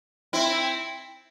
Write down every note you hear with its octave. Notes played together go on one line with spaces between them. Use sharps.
C4 E4